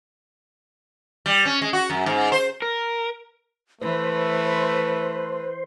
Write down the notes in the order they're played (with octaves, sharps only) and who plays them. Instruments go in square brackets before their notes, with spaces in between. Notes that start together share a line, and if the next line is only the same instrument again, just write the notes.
[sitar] G3
C#4
G#3
F#4
F#2
G#2
C5
[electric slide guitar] A#4
[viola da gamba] E3 [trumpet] A3 [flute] B4 [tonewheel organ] C5